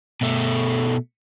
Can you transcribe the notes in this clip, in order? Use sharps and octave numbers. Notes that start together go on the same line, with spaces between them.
B2 A3